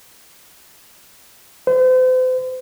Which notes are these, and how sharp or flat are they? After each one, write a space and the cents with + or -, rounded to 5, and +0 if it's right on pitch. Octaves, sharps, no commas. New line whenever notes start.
C5 -40